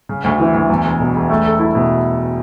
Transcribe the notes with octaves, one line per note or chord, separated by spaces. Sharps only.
C#3
D2
E3
D2
E2
E1
B2
E1
A3
A4
E4
B2